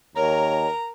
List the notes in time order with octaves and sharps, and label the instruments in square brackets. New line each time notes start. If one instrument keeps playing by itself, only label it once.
[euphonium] D#2 [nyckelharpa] A#4 [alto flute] C#5 [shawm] A#5